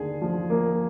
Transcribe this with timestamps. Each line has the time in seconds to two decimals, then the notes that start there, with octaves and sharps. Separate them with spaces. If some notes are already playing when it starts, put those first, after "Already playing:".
Already playing: D#2 D3 G#4
0.22 F3
0.50 A#3